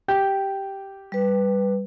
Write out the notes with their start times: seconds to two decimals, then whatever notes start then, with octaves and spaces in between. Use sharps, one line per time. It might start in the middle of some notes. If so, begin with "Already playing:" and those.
0.08 G4 G5 G6
1.12 G3 B4